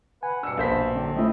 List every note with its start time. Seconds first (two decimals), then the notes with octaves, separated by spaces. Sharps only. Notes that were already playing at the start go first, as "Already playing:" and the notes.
0.23 B4 F#5 G#5
0.43 G2 B2 D4 E6 C#7
0.57 A#1 B4 C5 F5 B6
0.95 D3 F#3 C4 D4
1.17 A3 C#4 E4 D#5 E5 G5